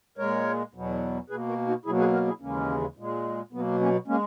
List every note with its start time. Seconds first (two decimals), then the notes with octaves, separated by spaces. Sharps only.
0.18 A#2 G#3 A#4 C#5
0.74 E2 B2 F#3
1.30 B2 A#3 G#4 B4
1.48 F#4 A#4
1.67 D#4 F#4
1.85 B2 F#3 A#3 E4 G#4
1.99 G#4 B4
2.13 F#4 A#4
2.27 E4 G#4
2.41 D#2 C#3 E3 G#3 A#3 C#4
2.97 A#2 G#3
3.52 B2 F#3 A#3 B3
3.80 A#3 C#4
4.08 G#3 A#3 C#4